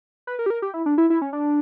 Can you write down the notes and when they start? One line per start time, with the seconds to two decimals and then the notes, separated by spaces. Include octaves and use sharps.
0.27 B4
0.39 A#4
0.46 G4
0.50 A#4
0.62 G4
0.74 E4
0.86 D4
0.98 E4
1.10 E4
1.22 C#4
1.33 D4